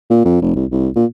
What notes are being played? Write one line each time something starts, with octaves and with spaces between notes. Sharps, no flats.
A#2
F2
F1
C2
C2
A#2